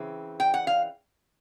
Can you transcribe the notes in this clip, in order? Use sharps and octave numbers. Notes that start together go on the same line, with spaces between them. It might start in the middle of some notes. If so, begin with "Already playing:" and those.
Already playing: C#3 E3 C4
G5
F#5
F5